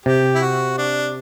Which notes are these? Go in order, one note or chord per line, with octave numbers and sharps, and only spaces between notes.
C3 G4
E4
F#4
D4